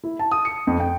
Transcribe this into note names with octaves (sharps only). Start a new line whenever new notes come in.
E4
A5
D#6
C#7
F2
G5